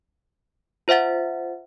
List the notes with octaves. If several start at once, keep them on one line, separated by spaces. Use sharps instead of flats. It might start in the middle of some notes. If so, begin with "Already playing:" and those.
F4 C5 E5 F#5 A6